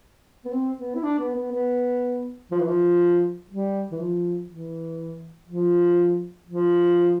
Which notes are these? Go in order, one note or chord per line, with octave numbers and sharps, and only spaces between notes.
B3
C4
B3
E4
D4
B3
B3
B3
F3
E3
F3
G3
E3
F3
E3
F3
F3